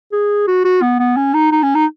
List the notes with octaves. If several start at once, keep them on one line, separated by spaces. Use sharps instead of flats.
G#4
F#4
F#4
B3
B3
C#4
D#4
D#4
C#4
D#4